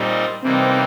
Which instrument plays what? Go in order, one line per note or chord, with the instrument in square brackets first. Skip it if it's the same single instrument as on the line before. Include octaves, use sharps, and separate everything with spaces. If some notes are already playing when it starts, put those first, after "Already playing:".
Already playing: [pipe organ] A#2 G3 C4 D#4
[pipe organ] C3 E3 G3 A#3 D#4 [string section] C4